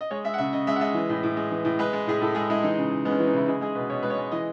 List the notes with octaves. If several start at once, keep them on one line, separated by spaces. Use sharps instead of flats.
D#5
G#3 C#5
G#3 E5
F#5
C#3 E5
C#3 D#5
G#3 E5
F#5
G#3 E5
E3
A2
A2
G#3
E3
A2
G#3 B4
G#3
A2 G#4
A2 A4
G#3 G#4
G#3 E4
E3 D#4
C#3
C#3
G#3 B3
C#4
B3
E3
D#4
C#3 E4
G#3 E4
G#3 G#4
B2 B4
B2 C#5
G#3 B4
C#5
G#3
E3 D#5